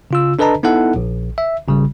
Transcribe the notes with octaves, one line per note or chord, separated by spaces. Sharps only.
C#3 F4 E6
D4 A4 B4 D#5 A5 A#5
B3 D#4 E4 A4 F#5
A#1
E5
G#1 C#3 G3